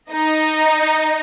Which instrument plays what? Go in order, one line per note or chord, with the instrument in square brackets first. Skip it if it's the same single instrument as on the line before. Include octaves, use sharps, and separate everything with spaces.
[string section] D#4 D#5